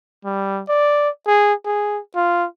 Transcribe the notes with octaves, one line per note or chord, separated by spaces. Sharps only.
G3
D5
G#4
G#4
F4